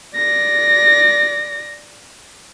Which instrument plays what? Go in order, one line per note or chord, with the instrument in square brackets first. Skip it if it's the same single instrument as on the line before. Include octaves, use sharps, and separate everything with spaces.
[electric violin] D5 A#6